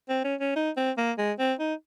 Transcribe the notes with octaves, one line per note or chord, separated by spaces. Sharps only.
C4
C#4
C#4
D#4
C4
A#3
G#3
C4
D#4